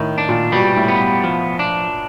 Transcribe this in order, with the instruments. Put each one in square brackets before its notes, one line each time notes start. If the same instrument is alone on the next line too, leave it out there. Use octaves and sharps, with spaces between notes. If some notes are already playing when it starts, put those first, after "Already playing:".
Already playing: [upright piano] A2 [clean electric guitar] D#3
[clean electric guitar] D4
[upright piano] A#2
[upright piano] B2 [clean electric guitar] G3
[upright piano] A2
[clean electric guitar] B3
F3
D4